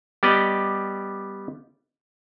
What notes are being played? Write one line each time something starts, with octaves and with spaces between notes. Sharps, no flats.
G3 B3 G4 D5 D#5